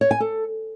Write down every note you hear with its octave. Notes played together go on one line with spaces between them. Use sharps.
C#5
G#5
A4